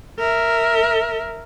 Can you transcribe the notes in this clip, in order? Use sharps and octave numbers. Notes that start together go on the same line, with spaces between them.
A#4 E5